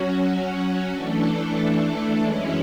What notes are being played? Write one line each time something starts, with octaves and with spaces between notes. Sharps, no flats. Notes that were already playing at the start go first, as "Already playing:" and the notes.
Already playing: F#3 C#4 F#4
E3 A3 D4 A4
F#2 E3 G#3 C#4 E4